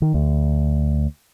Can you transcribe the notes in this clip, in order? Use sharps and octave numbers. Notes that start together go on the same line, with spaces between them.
D#3
D2